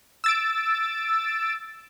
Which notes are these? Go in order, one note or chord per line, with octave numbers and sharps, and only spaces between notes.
E6 A6 D7